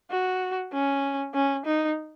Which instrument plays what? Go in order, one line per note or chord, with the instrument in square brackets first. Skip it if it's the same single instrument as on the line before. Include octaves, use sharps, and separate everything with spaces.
[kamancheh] F#4
C#4
C#4
D#4